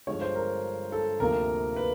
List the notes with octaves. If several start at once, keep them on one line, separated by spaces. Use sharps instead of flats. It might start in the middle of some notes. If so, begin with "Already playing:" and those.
G2 D3 F3 G#3 C#5
C5
A#4
A4
D2 C3 F3 A#3 A#4
B4